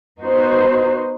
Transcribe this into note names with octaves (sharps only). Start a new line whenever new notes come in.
B3 D#4 F#4 C5